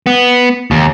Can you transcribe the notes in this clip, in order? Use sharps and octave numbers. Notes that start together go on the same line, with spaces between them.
B3
D#2